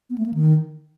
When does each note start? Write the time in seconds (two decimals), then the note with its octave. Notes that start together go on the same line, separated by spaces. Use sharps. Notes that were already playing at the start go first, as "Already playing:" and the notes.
0.10 B3
0.18 A3
0.26 A#3
0.34 D#3